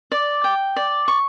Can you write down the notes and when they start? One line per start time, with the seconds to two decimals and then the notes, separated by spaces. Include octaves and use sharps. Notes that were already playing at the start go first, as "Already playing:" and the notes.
0.12 D5
0.44 G5
0.76 D5
1.08 C#6